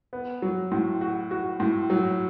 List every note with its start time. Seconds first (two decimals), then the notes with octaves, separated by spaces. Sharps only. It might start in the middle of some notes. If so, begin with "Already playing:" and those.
0.13 B3
0.42 F#3
0.72 A2
1.01 F#4
1.31 F#4
1.60 A2
1.90 F#3